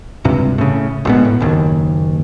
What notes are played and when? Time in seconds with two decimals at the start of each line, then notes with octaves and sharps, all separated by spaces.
0.25 C#2 G2 C3
0.58 A2 C#3
1.05 A#1 G#2 B3
1.25 A2
1.40 F#1 D#2